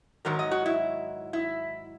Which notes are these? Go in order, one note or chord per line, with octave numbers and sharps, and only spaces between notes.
G#2 D#3 F#3 A#4
D#5
F#4
E4
E4